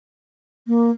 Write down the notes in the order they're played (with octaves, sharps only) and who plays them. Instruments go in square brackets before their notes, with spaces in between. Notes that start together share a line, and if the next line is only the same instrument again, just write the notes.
[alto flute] A#3